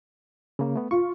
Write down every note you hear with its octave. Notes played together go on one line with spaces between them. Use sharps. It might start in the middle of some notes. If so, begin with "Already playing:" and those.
C#3 A#3
A3 B3
F4 C#6